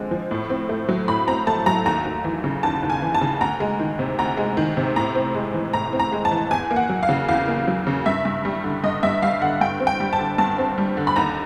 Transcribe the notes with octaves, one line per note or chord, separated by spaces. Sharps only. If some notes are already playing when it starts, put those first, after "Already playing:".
Already playing: D3 F3 G#3 C4
F3
A2
C4
A3
F#3
A2 B5
C4 A#5
A3 A5
F#3 A#5
D#2 A#5
D#2
E3
C#3
D#2 A5
D#2
G#5
E3
A5
C#3
D2 A#5
G#3
D#3
C3
D2 A#5
G#3
D#3
C3
A2 A#5
C4
G#3
E3
A2 A#5
C4
A#5
G#3
A5
E3
E2 G#5
A#3
F#5
F#3
F5
C#3
E2 F5
A#3
F#3
C#3
G2 E5
G2
G3
D3
G2 D#5
G2 E5
G3 F5
D3 F#5
G2 G5
C4
G5
G3
A5
D3
G2 A5
C4
G3
D3
B5
D#2 A#5